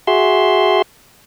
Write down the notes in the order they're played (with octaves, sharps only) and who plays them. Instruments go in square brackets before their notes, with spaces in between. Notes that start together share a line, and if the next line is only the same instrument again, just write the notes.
[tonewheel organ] F#4 G#4 E5 C6